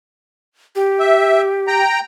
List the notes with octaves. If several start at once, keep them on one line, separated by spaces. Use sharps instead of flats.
G4
E5
G5 A#5